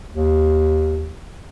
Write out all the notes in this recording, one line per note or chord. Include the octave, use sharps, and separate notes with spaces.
D#2